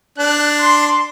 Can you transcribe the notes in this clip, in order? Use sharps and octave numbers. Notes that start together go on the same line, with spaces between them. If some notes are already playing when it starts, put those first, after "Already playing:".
D4 F#6
C6